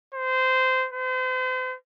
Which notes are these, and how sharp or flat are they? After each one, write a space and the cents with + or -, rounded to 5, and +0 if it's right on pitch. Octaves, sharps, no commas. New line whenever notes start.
C5 -20
C5 -40